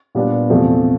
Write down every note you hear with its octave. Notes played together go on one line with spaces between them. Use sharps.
A#2 G3 B3 D4
E2 C3 F3 A3